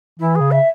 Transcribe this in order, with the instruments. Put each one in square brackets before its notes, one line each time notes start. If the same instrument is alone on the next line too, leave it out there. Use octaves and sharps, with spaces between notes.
[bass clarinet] E3 [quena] E4
[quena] G#4
[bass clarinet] C#3
[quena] E5